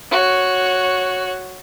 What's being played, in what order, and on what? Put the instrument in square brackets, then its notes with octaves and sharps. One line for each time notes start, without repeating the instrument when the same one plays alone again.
[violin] F#4 C#5